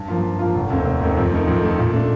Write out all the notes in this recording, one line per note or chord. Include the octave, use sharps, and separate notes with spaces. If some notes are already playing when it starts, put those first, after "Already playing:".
Already playing: G2
F3 A#3 F4
G2
F3 A#3 F4
F1
D#2 D#3 A3 C4
F1
D#2 D#3 A3 C4
F2
D#3 A3
F2
D#3 A3
A#2
A3 D4